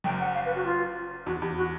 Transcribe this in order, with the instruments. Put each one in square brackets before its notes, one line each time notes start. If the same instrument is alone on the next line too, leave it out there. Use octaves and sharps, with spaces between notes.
[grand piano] F#1 F#2 [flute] G5
[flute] F#5
F5
B4
F#4
F4
[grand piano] E2 [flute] F#4
[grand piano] E2 [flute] G4
[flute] F#4